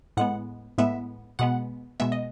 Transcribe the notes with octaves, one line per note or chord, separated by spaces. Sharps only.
A2 G#3 B3 F#5
A2 G#3 B3 E5
B2 G#3 B3 F#5
B2 G#3 B3 E5
D#5